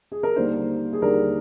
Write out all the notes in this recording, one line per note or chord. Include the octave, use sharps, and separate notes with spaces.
G#4
A#4
D#2 D3 G3 A#3 C5
G#4
D#2 D3 G3 A#3 A#4